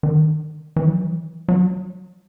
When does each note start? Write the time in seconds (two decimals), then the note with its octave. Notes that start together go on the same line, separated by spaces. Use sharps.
0.03 D#3
0.76 E3
0.86 F#3
0.96 E3
1.48 F#3